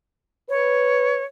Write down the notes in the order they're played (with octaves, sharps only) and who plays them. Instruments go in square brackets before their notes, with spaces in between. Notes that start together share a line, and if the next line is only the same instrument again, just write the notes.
[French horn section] B4 [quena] C#5